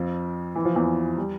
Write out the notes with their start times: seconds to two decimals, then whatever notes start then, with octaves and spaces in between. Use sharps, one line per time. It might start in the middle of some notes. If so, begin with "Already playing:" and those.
Already playing: F2 F3
0.56 E3
0.65 F3
0.76 E2 E3
1.17 G3